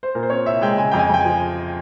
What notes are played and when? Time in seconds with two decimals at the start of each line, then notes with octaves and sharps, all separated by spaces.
0.03 C5
0.15 A#2 A#4
0.23 C5
0.30 C4 C#5
0.46 C2 E5
0.62 G#3 G5
0.77 C#3 G#5
0.91 F2 G5
0.99 G#5
1.10 F2 G5
1.21 F3 G#5